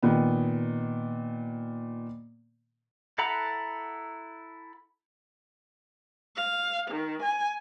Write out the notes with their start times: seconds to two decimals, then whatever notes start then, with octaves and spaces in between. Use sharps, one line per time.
0.03 A#2 D#3 B3
3.18 E4 A4 F#5 A#5 B5
6.36 F5
6.90 D#3
7.22 G#5